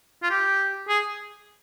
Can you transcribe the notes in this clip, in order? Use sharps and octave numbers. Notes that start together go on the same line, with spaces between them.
F4
G4
G#4